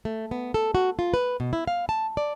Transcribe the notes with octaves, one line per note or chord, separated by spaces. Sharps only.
A3
B3
A4
F#4
F4
B4
B2
E4
F5
A5
D5